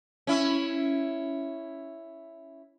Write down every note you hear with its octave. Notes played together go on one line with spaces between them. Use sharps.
C#4 E4